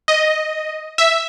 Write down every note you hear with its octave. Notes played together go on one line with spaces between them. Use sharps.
D#5
E5